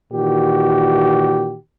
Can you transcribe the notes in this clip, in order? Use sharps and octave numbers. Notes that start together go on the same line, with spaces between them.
A#2 D#3 E3 F#4 G4